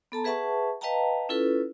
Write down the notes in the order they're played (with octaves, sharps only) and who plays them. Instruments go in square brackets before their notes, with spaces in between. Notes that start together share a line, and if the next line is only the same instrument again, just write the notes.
[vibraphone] B3 A4 A5 A#5
G#4 B4 E5 F#5 A5 C#6
B4 D#5 F5 G5 A5 A#5
C#4 E4 F4 A4 B4